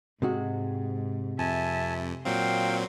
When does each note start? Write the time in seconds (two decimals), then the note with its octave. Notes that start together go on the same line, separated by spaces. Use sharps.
0.22 G#2 C3 G#3 F#4
1.39 F2 E5 G#5 A5
2.25 A#2 F#3 C4 F5 G5 C6